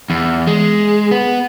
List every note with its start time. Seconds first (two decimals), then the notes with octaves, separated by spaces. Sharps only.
0.10 E2
0.47 G#3
1.11 B3